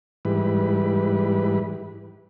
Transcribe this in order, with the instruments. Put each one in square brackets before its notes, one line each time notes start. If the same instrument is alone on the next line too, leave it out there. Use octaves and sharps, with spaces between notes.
[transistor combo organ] G#2 E3 G3 B4